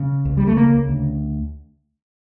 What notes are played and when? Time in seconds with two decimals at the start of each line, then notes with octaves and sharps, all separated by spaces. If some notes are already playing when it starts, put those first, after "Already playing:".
Already playing: C#3
0.25 C#2
0.37 G3
0.47 A3
0.56 C#3 A#3
0.88 D2